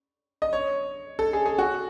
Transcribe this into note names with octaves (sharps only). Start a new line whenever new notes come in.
D#5
C#5
A4
G#4
G#4
F#4